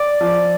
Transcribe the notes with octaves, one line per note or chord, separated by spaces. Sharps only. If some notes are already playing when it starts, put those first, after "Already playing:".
Already playing: D5
F3